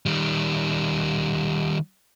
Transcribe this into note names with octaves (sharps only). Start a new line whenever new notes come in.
D#3 G3